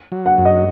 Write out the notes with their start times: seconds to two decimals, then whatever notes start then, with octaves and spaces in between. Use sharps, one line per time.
0.12 F#3
0.26 F#5
0.38 F#2
0.45 D#5